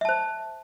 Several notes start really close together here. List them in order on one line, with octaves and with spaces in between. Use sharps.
E5 A5 C5